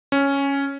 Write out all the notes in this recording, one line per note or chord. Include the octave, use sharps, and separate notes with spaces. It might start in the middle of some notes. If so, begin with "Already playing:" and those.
C#4